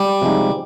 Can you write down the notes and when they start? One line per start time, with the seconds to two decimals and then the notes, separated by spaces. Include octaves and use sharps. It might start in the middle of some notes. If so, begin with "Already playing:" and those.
Already playing: G3
0.22 C3 F3 G#3 D#4